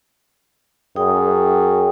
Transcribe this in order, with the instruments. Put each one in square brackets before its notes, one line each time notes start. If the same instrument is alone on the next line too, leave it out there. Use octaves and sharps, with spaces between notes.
[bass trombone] F#2 [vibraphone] G#4 G5 D#6